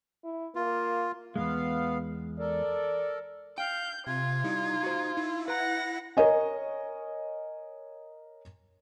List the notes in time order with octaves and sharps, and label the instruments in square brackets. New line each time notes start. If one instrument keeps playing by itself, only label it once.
[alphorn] E4
[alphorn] A#3 [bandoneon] F4
[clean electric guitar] E2 G#2 G#3 [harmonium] B3 F5
[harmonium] A4 A#4 [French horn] D5
[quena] F5 [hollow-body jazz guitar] G5 [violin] G6
[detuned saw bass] C3 [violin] F4 [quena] G#6
[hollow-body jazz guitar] G3 E4 [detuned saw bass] D#4
[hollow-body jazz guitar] F#4 C5
[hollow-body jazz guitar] D#4 [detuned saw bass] E4
[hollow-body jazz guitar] B4 A#5 [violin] F#5 A#6 [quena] F#6
[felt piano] A#4 C#5 D#5 G#5